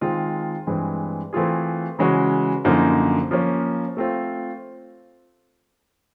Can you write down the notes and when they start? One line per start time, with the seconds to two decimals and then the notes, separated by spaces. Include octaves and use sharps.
0.01 D#3 G#3 C4 F4
0.67 G2 E3 G#3 C4
1.33 E3 A3 C4 F4 G#4
1.99 C#3 E3 G#3 C#4 F#4
2.65 F#2 D3 F3 A#3 D#4
3.31 F3 A#3 C#4
3.97 A3 C4 F4